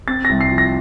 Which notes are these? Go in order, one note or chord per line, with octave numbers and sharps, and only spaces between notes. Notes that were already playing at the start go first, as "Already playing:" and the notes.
C4 A6
A#6
C2
C7
F3
A#6